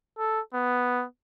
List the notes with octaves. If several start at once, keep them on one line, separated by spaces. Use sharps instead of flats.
A4
B3